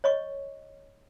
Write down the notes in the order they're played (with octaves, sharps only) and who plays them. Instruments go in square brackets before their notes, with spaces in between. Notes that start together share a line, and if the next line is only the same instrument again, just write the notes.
[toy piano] C#5 D#5 C#6